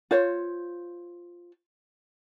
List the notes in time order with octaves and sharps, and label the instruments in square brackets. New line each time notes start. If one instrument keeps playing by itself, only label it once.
[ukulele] F4 C5 C#5